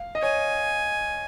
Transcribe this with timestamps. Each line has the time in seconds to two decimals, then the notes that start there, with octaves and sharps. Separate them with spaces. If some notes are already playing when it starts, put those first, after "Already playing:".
Already playing: F5
0.15 D#5
0.22 C#5 G#5